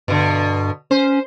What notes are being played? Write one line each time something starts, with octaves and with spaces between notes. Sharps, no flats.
G2 B2 D3
C#4 C5